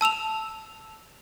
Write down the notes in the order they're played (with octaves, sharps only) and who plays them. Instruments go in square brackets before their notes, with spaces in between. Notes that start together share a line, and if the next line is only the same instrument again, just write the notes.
[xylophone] A5 E6 E7 F7